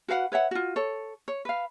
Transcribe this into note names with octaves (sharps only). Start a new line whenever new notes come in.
F#4 B4 F5 F#5
B4 C#5 E5 F#5
F4 F#4
A4 C#5
C#5
B4 F5